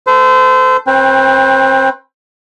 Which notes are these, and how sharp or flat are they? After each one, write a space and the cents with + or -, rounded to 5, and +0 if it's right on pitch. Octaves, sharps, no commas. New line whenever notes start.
A4 +0 C5 -30
C4 +35 B4 +0 G5 +15